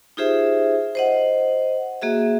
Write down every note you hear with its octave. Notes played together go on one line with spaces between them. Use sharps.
D#4 F4 G4 G#4 C5 E5
C5 D#5 F#5
A#3 F#4 G#4 E5